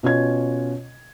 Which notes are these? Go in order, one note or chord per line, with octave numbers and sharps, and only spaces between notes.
B2 C#4 F4 C#5 G#6